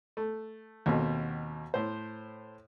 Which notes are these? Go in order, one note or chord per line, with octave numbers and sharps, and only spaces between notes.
A3
D#2 B2 A3 C4
A2 C5